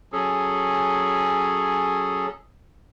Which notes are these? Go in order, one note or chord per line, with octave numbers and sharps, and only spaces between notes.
F#3 C#4 G#4 A4